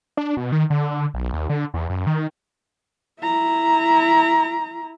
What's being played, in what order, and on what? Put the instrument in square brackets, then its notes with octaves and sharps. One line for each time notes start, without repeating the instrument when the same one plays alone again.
[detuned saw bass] D4
B2
D#3
D3
B1
D#2
D3
E2
F#2
D#3
[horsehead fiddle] E4 A#5